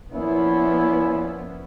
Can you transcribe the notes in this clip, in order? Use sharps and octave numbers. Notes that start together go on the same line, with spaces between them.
A#2 F3 B3 C#4 E4